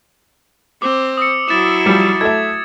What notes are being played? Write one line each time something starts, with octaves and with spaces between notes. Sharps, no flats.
C4 D6
D#6 E6 C#7
F#3 E4 A6 E7
F3 G3
A3 A4 E5 G#6